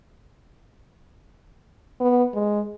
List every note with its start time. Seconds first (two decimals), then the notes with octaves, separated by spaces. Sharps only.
2.00 B3
2.34 G#3